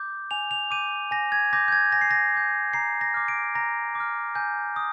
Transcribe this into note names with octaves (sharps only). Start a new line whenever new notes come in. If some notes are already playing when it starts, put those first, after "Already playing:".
Already playing: D6 G6
G#5 F7
F7
D6 G6 D#7
G#5 A#6
G#6
D6 G6 A#6
G6
G#6
G#5 A#6
C7
A#6
D6 G6
A#5 C7
A#6
D6 F6
D7
A#5 A#6
D6 F6
G#5 G6
D#6